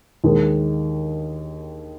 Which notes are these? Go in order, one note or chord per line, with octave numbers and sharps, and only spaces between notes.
D#2 D#3 G#3